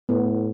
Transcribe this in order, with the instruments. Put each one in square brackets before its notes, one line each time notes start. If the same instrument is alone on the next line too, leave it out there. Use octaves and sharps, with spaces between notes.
[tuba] A2 [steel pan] B3